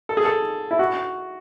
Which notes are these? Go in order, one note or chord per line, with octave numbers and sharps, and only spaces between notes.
A4
G#4
A4
E4
F#4